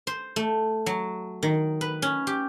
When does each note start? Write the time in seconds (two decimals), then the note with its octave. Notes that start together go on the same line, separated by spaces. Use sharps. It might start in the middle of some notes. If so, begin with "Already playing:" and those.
0.07 C5
0.36 A3
0.86 F#3
1.43 D#3
1.81 B4
2.02 C#4
2.27 G4